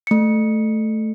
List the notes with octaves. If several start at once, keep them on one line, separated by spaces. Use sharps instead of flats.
A3 C#7